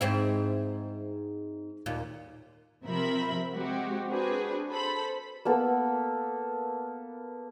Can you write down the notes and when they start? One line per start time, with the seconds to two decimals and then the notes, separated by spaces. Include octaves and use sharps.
0.01 G#2 C4 E4
1.86 D#2 A#2
2.84 C3 F3 C4 A#4 E5 B5
3.54 G#3 C4 F#4 G4
4.09 C4 D4 F#4 G#4 B4
4.70 A4 C5 B5
5.45 A#3 B3 A4